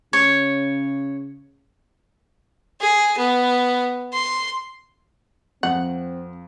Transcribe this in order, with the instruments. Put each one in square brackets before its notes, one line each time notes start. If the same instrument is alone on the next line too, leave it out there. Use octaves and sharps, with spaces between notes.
[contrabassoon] C#3 [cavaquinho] C#5
[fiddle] G#4
B3
C6
[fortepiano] F2 [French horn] C4 [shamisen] F#5